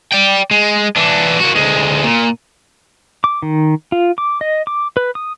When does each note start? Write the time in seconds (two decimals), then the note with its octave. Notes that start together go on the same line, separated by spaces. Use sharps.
0.13 D5 G5
0.51 G#3
0.96 E3 D4
1.39 A#3 F#4
1.55 D2 G#3
2.05 A#2
3.24 D6
3.42 D#3
3.92 F4
4.18 D6
4.41 D#5
4.67 D6
4.97 B4
5.15 D#6